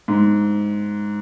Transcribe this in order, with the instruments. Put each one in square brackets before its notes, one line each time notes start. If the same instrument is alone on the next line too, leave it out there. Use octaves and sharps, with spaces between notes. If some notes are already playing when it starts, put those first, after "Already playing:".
[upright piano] G#2